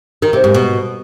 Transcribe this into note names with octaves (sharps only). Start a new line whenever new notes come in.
D#3
C3
G#2
B2